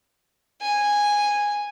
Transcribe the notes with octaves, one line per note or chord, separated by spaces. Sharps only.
G#5